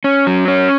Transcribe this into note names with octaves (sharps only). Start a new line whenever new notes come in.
C#4
F#3
C#4